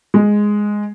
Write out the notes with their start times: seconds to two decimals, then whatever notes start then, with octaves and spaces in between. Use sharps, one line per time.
0.14 G#3